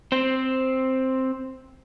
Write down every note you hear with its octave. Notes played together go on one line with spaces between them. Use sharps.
C4 C5